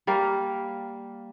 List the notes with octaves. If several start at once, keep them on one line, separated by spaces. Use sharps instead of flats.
G3 A#3 F5